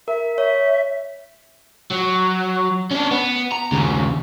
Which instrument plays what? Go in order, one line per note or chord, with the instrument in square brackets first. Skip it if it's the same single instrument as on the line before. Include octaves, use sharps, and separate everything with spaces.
[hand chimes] A#4 [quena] E5
[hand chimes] C#5 [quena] E5
[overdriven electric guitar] F#3
C#4 D4
B3
A#5
D#2 C#3